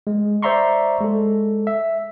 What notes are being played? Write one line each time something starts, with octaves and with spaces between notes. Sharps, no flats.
G#3
C5 D5 E5 A#5 C6 C#6
G#3 A4
E5